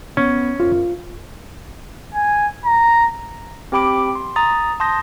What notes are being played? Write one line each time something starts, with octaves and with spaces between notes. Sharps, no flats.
B3 C#4
F#2 F4
G#5
A#5
C4 G4 G5 B5 D6 D7
C6
A#5 D#6 A6
A5 C6 D#6 G6 A#6